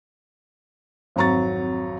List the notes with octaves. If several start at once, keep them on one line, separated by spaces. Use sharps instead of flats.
G#1 F2 F#3 A#5 C#6 A6